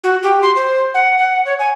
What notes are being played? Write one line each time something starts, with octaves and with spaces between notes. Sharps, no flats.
F#4
G4
C6
C5
F#5
F#5
C#5
G#5